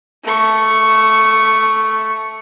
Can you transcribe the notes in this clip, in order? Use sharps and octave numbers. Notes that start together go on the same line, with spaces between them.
A3 C#6